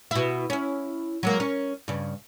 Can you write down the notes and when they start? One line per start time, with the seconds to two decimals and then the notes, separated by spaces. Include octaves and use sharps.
0.11 B2 E4
0.50 C#4 E4
1.23 F#3 G#3 A#3
1.40 C#4 A#4
1.88 G2 C#3